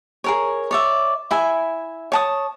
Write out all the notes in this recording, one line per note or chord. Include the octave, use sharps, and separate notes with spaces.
G#4 A#4 C#5
C#5 D5 E5
E4 E5 G#5
C#5 A5 D#6